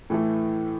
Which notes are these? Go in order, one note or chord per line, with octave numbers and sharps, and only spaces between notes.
A2 E3 A3